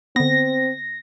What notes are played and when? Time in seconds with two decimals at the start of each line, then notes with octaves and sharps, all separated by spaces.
0.16 D3 B3 C4 A#6